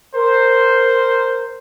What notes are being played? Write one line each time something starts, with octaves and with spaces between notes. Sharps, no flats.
A#4 C5